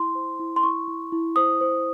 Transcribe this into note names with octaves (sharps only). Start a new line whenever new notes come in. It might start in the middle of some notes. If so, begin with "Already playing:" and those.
Already playing: E4 C6
C5
E4
C6
E4 C#6
E4
E4
C5 D#6
C5